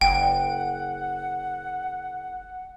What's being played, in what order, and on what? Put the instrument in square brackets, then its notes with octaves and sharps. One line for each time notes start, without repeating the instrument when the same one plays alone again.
[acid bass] F#1 [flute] F#5 [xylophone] G5